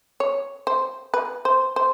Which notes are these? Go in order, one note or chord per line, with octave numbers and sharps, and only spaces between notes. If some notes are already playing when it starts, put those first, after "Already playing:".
C#5
C5
B4
C5
C5